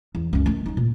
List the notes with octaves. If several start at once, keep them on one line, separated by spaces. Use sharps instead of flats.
E2
C#2 F#2
D#3 A3
F#3 D#4
A#2